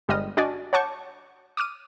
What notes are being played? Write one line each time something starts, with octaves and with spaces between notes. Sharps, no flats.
G1 G3 G#3 D#5 D#6 F6
D4 F#4 D5 D#5 G#5
C#5 F#5 A5 C#6 D6 G6
D6 D#6 F6 D#7